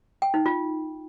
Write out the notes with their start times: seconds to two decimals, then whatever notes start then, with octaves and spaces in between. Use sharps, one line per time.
0.22 G5
0.34 D#4
0.46 F4